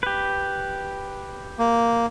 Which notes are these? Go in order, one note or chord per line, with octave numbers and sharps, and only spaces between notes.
G4 B4
A#3